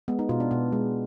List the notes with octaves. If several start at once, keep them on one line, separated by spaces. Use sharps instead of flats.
G#3 B3
D#4
B2 F4
D4
B2 B3
G#3